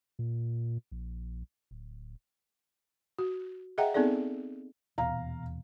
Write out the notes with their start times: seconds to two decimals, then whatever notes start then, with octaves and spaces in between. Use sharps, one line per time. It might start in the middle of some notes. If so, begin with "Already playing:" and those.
0.19 A#2
0.91 A#1
1.71 D1
3.18 F#4
3.78 G#4 D#5 E5 F#5 G5 A#5
3.94 B3 C4 D#4 G#4 A4 D5
4.98 D#1 E2 B2 F5 A#5